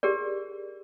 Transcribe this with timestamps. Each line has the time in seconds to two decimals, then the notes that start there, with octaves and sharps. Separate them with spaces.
0.03 G4 G#4 A#4 D5